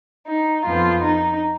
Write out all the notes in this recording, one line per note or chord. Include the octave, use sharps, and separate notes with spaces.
D#4
F2 F3 B3 F4
D#4